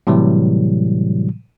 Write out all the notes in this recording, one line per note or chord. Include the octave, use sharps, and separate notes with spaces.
A2 C3 E3 F#3 G3